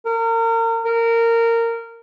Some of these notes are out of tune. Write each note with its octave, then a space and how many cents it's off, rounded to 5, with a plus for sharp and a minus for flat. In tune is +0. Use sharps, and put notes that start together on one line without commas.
A#4 -35
A#4 -15